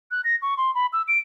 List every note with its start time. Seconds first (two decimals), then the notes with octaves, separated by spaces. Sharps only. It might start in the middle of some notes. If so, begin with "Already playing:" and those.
0.11 F#6
0.24 A#6
0.42 C#6
0.57 C6
0.75 B5
0.93 E6
1.08 D7